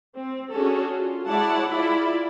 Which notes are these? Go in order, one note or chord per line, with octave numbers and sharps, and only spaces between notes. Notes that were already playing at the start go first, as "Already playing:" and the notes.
C4
C#4 D4 F#4 G#4 A4
F4
G#3 E4 C#5 D5 F#5 A5
E4 F4 G#4 D5 B5